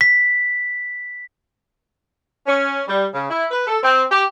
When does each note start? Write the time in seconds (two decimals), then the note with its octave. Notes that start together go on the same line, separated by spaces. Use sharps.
0.01 B6
2.45 C#4
2.87 G3
3.12 C#3
3.29 E4
3.50 B4
3.67 A4
3.82 C4
4.11 G4